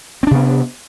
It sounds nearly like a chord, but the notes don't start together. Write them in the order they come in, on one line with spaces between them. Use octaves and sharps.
C4 D4 C3 B3